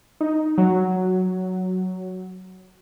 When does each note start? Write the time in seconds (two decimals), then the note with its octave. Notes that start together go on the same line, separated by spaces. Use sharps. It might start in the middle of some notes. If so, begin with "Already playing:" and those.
0.21 D#4
0.58 F#3